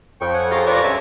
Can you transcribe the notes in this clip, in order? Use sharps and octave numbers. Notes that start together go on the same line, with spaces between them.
F2 G5 C#6
C#5 F#5 G#5
C#4 F4 G4 G#4 C#5 A#5
F4 B4 C#5 D5 A#5
C#2 G2 E5 G#5